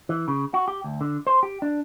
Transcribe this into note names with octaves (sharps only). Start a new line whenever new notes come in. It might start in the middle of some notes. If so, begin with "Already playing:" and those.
E3
C#3
F#4
G4
D2
D3
C5
G4
D4